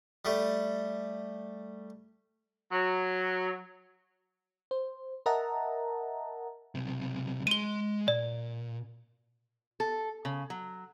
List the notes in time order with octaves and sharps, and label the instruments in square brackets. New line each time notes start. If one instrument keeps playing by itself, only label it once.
[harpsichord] G3 A3
[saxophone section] F#3
[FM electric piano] C5
A#4 D#5 E5 F#5 A5 A#5
[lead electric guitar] B1 C3
[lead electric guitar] G#3 C6 [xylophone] D#7 G7
[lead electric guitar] A#2 [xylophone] D5
[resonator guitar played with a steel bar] A4
C#3
F#3